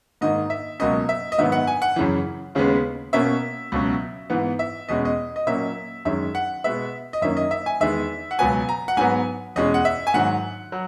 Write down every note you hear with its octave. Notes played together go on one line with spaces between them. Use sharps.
G#2 D#3 A#3 D#5
E5
C#2 B2 F#3 A#3 C#4 D#5
E5
D#5
G#2 D#3 F#3 B3 E5
F#5
G#5
F#5
F#2 C#3 E3
D#2 C#3 G#3 B3
B2 A#3 C#4 E5
C#2 B2 F#3 C#4
G#2 E3 B3
E5
E2 B2 G#3 C#4 D#5
D#5
D#5
A#2 F#3 A#3 C#4 E5
F#2 D#3 G#3 C#4 E5
F#5
B2 G#3 B3 E5
D#5
F#2 D#3 A#3 C#4 E5
D#5
E5
G#5
E2 D#3 G#3 B3 E5
F#5
C#2 B2 F#3 B3 G#5
A#5
F#5
G#2 F#3 B3 G#5
E2 B2 G#3 C#4 D#5
F#5
E5
G#5
G#2 D#3 F#3 F#5
F#3